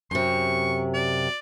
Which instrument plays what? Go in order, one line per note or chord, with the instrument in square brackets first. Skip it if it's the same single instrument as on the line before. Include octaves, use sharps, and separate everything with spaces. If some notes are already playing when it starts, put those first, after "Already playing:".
[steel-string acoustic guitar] F#2 C3 [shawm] C#6
[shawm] D5